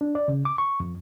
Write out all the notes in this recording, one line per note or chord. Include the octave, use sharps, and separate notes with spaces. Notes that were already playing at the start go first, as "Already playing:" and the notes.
D4
D5
C#3
D6
C#6
F2